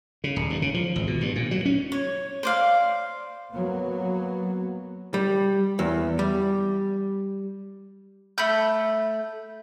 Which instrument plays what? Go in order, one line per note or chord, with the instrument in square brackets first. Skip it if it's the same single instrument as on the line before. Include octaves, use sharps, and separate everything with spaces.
[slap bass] C#3
D#1
G2
C#3
F3
G#1
B2
G2
A#2
F#3
C#4
[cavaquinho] C#5
C5 D5 F5
[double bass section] F#3 A#3 B3
[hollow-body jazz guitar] G3
E2
G3
[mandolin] A3 B5 G6